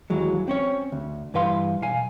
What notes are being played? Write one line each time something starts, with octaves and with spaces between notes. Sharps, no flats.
D#2 E3 F#3 G#3
C4 C#4 C#5
D2
G2 E3 B4 F5 C6
B1 F5 G#5